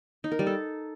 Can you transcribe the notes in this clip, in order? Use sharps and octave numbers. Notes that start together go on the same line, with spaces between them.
D#4
A#4
G3
A4